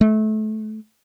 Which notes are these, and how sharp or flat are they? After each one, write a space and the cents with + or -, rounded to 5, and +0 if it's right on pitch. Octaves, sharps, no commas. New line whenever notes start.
A3 -25